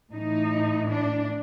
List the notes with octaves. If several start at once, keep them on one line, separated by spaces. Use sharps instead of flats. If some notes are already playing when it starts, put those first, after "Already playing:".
A2 E3 D#4
D4